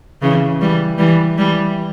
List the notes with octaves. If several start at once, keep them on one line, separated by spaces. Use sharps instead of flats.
C#3 E3
E3 G3
E3 G3
E3 G3